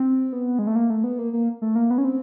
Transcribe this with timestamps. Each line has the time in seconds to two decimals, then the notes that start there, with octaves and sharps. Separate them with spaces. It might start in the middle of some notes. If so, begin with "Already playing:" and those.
Already playing: C4
0.33 B3
0.59 G#3
0.67 A3
0.76 A#3
0.90 A3
1.04 B3
1.19 A#3
1.33 A#3
1.62 A3
1.76 A#3
1.90 B3
1.98 C#4
2.05 C4